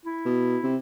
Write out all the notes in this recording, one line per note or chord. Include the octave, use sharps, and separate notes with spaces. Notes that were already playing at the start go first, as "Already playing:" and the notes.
E4
B2
C3